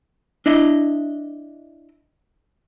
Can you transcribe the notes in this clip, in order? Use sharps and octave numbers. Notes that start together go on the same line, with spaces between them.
D4 E4 D#5